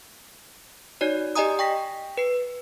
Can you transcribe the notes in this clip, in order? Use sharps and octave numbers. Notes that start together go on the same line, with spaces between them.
D#4 F#4 C#5 D5
G4 D5 D#5 G#5 A#5 D#6
G5 C#6 A#6 B6
B4 C7